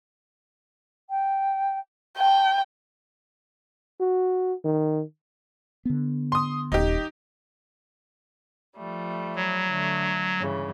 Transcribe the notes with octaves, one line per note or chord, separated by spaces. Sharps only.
G5
G5 A5
F#4
D#3
D3 B3
C6 D#6
D#1 D#4 G4
F3 G3 A3
F#3
D3 A3
G2 C#3 E3